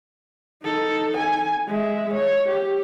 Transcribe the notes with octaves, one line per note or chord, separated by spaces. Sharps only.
D#4 A4
G#5
G#3 E5
C#5
G4